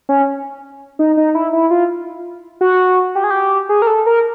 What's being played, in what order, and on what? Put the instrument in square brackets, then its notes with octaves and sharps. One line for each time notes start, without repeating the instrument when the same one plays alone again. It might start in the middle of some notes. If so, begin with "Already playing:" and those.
[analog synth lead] C#4
D#4
D#4
E4
E4
F4
F#4
G4
G#4
G4
G#4
A#4
A4
A#4